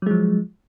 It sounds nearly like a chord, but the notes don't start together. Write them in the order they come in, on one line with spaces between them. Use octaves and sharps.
F#3 G#3 F3